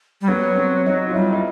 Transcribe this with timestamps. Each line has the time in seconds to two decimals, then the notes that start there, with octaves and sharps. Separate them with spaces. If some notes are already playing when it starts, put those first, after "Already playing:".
0.21 G3
0.28 F#3 B3
0.57 C4
0.86 F#3 D#4
1.10 F4
1.14 G3 E4
1.32 D#4